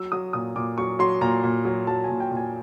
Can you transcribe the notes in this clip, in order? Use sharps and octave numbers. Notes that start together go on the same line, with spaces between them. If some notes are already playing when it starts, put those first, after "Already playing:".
Already playing: F#3 E6
F#3 D#6
A#2 D#6
A#2 D6
F#3 C#6
F#3 C6
A#2 A#5
A#2
F#3
F#3 A5
G#5
A#2
G5
A#2
G#5